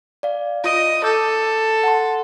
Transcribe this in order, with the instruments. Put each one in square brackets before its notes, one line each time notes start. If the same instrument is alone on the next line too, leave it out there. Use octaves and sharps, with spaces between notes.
[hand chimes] D5 F5
[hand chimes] F4 D#6 D7 [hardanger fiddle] D#5
[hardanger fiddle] A4 [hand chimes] D6 E6 G6
[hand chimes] F#5 A5 C6